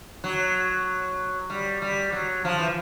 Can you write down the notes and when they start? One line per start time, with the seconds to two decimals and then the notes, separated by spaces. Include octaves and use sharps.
0.24 F#3
1.50 G3
1.82 G3
2.12 F#3
2.45 F3
2.58 E3